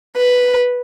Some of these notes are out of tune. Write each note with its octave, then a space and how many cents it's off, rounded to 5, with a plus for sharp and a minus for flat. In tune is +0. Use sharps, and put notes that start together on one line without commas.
B4 +0